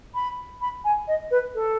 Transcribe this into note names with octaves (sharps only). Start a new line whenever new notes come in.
B5
B5
G#5
D#5
B4
A4